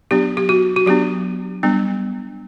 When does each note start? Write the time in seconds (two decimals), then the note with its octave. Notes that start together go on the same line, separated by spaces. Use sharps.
0.11 F#3 B3 D4 G4
0.37 G4
0.49 F#4
0.76 F#4
0.86 F#3 B3 D4 G4
1.63 G3 B3 D4